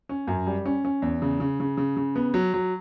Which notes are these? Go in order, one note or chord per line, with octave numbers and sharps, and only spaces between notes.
C#4
F#2
G3
C#4
C#4
E2
C#3
C#3
C#3
C#3
C#3
B3
F#3
F#3